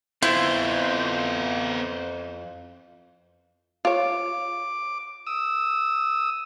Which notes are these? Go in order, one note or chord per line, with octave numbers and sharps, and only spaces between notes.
F2 B3 E4 F4 C5
F4 C#5 D6
D#6 E6